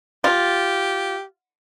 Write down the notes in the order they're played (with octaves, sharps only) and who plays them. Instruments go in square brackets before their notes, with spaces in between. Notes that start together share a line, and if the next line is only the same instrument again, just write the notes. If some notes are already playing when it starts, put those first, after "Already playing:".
[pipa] F4 [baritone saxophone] G4